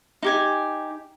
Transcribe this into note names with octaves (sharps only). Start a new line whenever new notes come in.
D#4 G4 G#5